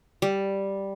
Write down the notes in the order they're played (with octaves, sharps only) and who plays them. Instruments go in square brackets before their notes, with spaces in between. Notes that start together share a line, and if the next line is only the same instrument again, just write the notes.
[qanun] G3